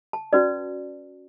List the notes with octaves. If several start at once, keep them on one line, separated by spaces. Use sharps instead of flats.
A5
C#4 F#4 B4 D5